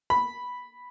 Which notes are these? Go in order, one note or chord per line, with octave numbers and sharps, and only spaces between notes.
B5